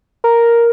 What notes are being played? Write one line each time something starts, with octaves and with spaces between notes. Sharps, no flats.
A#4